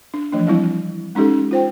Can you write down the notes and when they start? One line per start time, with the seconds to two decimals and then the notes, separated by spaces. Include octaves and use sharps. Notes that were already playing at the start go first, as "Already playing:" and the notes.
0.14 D4
0.32 E3 F3 A3 D4
0.47 F#3 G3 C4 E4
1.15 G#3 C#4 D#4 G4 A4
1.51 F4 C5 G5